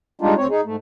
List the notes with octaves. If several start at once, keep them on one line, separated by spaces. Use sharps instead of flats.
G3 G#3 D4 D#4 F4
D2 C4 C#5
D#4 G#4
G#2 A3